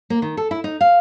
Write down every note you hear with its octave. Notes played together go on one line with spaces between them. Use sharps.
A#3
D#3
A4
E4
D#4
F5